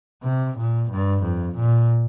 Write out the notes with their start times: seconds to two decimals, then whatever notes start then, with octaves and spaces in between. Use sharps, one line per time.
0.23 C3
0.57 A#2
0.90 G2
1.23 F2
1.56 A#2